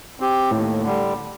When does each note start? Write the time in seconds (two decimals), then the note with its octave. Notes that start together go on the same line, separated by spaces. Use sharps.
0.20 C4 G4
0.51 D#2 A2
0.82 D3 G3